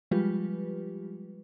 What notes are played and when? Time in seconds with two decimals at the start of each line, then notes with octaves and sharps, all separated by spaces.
0.11 F3 G3 G#3 F4 G4 B4